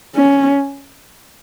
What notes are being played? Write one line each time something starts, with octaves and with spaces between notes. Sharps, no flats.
C#4